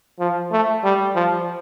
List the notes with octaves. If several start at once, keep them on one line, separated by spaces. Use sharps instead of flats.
F3
A3
G3
F3